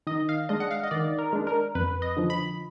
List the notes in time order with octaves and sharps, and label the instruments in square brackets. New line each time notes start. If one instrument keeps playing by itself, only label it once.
[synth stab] D#3 D#5
F5
G#3 D4 D#5
F#5
F5
D#5
D#3 D5
A#4
G#3 D4
A#4
F2 B4
D#5
D3 F3
B5